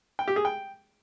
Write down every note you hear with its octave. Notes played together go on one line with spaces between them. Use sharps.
G5
G4
G#4
G5